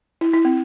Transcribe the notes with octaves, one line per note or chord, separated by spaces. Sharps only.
E4
E4
C4